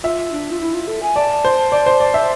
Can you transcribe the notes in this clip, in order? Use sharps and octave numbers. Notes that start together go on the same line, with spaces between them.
F4 E5
D4
F4
E4
F4
A4
G#5
D5 A5
C5
D5
C5
D5
E5